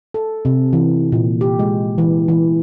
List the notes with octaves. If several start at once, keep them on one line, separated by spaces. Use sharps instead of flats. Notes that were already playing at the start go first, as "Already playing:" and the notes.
A4
C3
E3
A#2
G4
G#3
E3
E3